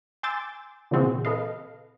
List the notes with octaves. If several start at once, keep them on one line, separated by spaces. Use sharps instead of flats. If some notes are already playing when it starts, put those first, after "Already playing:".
G#5 C6 D6 E6 G6 A6
A#2 C#3 E3 C4 F#4 G#4
A4 B4 D#5 F5